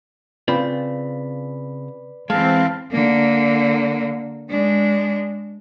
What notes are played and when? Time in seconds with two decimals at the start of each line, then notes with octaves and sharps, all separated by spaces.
0.48 C#3 C4 F4 B4 D5 B5
2.30 E3 G#3 C4 F5 A5
2.92 D3 A#3
4.49 G#3 D4